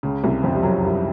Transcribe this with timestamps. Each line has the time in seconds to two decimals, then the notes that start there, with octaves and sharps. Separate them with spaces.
0.03 C#2 C#3
0.23 C2 C3
0.43 F2 F3
0.55 G3
0.63 F#2 F#3
0.83 G2 G3